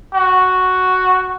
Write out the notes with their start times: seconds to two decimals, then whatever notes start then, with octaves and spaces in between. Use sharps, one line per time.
0.14 F#4